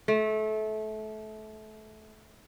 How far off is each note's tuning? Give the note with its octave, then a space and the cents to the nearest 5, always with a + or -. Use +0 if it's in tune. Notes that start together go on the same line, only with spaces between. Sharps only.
A3 -25